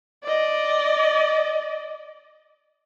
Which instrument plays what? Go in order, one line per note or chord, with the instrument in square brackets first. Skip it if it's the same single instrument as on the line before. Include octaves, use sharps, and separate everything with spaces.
[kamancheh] D5 D#5